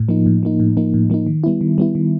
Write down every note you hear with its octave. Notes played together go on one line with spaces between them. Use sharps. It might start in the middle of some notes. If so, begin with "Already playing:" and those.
Already playing: A2
F3 A#3 D#4
A2
F3 A#3 D#4
A2
F3 A#3 D#4
A2
F3 A#3 D#4
D#3
G3 B3 E4
D#3
G3 B3 E4
D#3